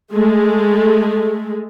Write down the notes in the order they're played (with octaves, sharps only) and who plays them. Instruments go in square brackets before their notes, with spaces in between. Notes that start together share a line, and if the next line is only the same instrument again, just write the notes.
[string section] G#3 A3